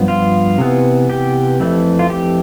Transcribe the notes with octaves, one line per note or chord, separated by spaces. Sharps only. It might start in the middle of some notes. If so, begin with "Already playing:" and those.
Already playing: G2 F3 B3
F4
C3 E3 B3
G4
F2 E3 A3
F4
G4